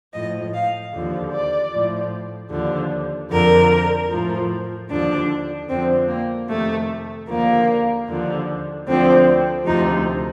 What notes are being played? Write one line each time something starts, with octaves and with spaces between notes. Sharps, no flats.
A2 F3 D#5
F5
D#2 D3 F3
D5
A2 F3
D#2 D3 F3
F2 D3 F3 A#4
A2 F3
D#2 D3 F3 D4
F2 D3 F3 C4
A#3
F2 C3 D#3 A3
D#2 D3 F3 A#3
D#2 D3 F3
D2 D3 F3 C4
D2 C3 F3 D#4